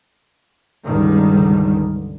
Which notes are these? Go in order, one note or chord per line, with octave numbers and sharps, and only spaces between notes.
G1 C#2 D3 D#3 G3